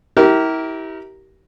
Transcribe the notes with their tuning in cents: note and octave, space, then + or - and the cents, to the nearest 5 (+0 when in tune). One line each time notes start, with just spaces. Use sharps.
E4 -30 G4 -30 A#4 +0